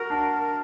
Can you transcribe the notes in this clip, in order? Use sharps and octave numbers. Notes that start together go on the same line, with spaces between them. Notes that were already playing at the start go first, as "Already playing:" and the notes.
Already playing: F#4 A#4
D4